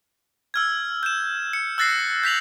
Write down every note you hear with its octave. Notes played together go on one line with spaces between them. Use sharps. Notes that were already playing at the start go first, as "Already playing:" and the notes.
E6 F6 G#6
G6 E7
C#7
E6 F#6 A6 A#6 C7
G6 B6 F7 F#7